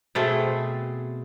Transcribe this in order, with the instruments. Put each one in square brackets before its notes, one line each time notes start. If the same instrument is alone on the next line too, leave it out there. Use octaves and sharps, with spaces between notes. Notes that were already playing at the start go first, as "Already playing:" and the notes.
[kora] B2 A3 C4 G#4